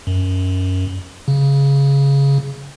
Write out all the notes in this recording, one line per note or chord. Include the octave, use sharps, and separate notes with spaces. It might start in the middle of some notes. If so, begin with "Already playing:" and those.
F#2
C#3